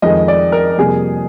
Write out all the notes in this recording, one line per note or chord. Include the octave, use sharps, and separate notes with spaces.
F2 D#3 G#3 D#5
D5
A#4
F2 C3 G3 A#3 G#4